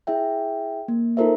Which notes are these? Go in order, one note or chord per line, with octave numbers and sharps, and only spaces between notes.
E4 G#4 E5 G5
A#3
D#4 F4 A4 A#4 C5 E5